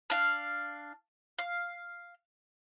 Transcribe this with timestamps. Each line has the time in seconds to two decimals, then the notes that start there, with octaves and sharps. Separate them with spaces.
0.10 D4 F5
1.39 F5